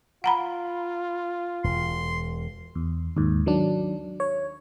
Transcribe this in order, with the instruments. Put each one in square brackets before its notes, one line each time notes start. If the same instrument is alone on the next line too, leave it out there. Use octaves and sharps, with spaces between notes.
[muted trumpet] F4 [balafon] F#5 A#5 B5
[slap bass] E1 [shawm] C6
[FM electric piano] E2
D#2 G#2
D#3 F#3 D4
C#5